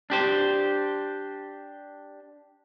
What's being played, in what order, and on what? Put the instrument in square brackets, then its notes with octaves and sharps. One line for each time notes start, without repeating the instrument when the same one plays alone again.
[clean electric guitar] D4 G4 C5